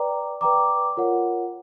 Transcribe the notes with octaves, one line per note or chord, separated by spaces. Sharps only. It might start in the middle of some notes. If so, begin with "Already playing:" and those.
Already playing: B4 D5 G5 A#5 D6
B4 D5 G5 A#5 D6
F4 A#4 C#5 F#5